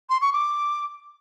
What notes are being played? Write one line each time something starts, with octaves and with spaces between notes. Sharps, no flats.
C6
C#6
D6